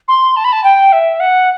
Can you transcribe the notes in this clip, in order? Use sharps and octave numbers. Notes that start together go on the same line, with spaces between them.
C6
A5
B5
A5
G5
E5
F#5